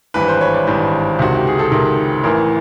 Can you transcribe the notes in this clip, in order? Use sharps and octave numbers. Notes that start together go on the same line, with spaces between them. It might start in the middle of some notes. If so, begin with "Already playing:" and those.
G#1 G2 E3 B4
C5
C#5
D5
G#1 G2 E3 C5
C#2 C3 D#3 F#4
G4
G#4
A4
C#2 C3 D#3 A#4
A1 A2 E3 A#4